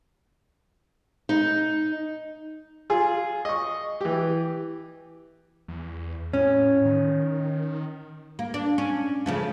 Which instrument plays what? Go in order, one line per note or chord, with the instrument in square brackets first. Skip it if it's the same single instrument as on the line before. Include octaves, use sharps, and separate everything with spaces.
[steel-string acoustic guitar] D#4
[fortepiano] F4 G#4
D#5 C#6
E3 G4
[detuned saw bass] E2
[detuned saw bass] A2 [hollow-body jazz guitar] C#4
[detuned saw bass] D#3
[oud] A#3
D4
C#4
C#3 F3 A3